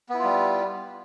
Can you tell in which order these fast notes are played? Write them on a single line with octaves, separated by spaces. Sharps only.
B3 E4 F4 G3